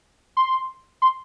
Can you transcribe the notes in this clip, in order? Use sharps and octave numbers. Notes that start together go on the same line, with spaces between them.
C6
C6